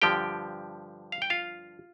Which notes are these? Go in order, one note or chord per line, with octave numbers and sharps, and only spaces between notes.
G2 D3 F3 G4 G5
F5
G5
F4 F5